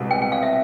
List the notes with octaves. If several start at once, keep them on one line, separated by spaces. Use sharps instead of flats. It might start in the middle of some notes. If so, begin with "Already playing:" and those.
Already playing: C2 B2 G#3
G5
G5
F5
E5